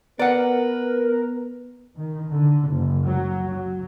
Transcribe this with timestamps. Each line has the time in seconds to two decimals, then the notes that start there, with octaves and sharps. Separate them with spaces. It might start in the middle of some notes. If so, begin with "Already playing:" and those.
0.19 B3 A#4 B4 D5 F#5
1.98 D#3
2.32 D3
2.70 F#1
3.04 F#3
3.47 F#3